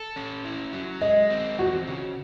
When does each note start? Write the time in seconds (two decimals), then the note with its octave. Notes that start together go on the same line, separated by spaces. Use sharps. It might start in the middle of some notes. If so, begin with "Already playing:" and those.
Already playing: A4
0.16 C#4
0.45 E4
0.73 F#3
1.01 G#3 D#5
1.30 C4
1.58 E2 F#4
1.88 C#3